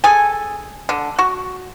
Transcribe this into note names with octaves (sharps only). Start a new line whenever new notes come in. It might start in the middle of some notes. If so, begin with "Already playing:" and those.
G#4 A4 G#5
D3
F#4